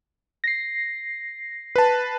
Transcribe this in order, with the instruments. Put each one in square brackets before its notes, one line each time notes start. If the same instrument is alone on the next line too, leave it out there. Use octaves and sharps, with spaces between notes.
[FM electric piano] A#6 C7
[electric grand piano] B4 A5